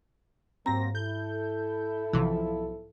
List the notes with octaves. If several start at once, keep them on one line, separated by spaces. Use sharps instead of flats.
G#2 F#3 A#3 C4 A#5 A#6
E4 A4 G6
B1 C3 E3 F3